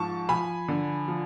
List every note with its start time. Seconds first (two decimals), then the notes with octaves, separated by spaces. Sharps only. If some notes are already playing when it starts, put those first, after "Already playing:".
Already playing: G#2 F3 A5 C#6
0.29 F3 G#5 B5
0.68 D3
1.08 F3